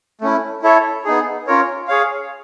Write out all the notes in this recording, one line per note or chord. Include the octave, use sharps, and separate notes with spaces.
A3 C#4 E4
E4 A4 C#5 E5
B3 D#4 G#4
C#4 F4 A#4 C#5
G#4 C#5 F5